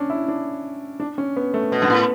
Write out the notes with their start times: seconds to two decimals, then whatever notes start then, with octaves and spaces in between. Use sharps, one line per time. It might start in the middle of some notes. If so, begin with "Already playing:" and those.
Already playing: C#4 D4
0.10 E4
0.28 D4
1.00 D4
1.18 C#4
1.36 B3
1.54 A3
1.72 B2 B3
1.82 G2
1.90 A2 B3